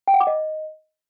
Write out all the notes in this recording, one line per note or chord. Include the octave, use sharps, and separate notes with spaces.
G5
F#5
D6
D#5